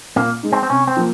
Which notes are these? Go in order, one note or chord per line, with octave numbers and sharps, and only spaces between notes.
A#2 A#3
G#3 D#4
C4
C4
C3 C#4
C4
F3 A#3